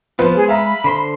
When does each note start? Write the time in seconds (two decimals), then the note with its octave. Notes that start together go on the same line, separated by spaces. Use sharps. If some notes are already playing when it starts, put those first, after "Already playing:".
0.19 F3 B3 F4 B4 C5
0.35 G#3 G#4
0.48 E5 F5 A#5 B5
0.84 D3 C5 C6